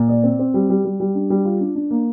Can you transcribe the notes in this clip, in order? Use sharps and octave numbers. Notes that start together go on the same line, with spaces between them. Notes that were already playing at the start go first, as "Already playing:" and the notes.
Already playing: A#2
D5
C4
C4
G3
G3
G3
G3
D4
G3
F4
D4
D4
A#3